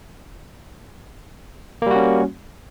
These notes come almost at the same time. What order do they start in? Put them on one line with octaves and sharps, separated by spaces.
A#3 G3 F#4 C#4